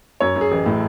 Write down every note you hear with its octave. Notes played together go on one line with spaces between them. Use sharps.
F#2 C#5
F#2
G#4
A1
A2